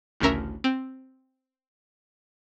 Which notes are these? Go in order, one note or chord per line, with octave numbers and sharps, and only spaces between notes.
A1 D2 C#3 C#4 A#4 E5
C4